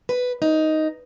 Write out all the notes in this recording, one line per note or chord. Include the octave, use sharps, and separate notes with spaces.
B4
D#4